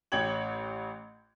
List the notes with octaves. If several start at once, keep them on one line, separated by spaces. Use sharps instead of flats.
A1 C#4 C#5 G5 G#6 F#7